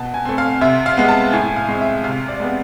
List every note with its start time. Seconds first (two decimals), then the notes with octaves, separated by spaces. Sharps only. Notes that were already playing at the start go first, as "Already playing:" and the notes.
Already playing: B2 A5
0.14 G#5
0.25 A3 C4
0.38 F5
0.61 C3 E5
0.86 F5
0.97 G#3 B3
1.09 A5
1.33 A2 G#5
1.56 F5
1.68 G#3 C4
1.81 E5
2.04 C3 F5
2.28 D5
2.40 G#3 B3